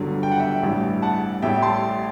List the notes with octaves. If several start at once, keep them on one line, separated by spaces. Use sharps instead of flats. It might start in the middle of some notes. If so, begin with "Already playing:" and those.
Already playing: G1 G2 D3 F#3
G5
F#5
E5 G5
A1 G2 E3 G3
F#5 A5
A1 A2 G3 E5 G5
A5 C6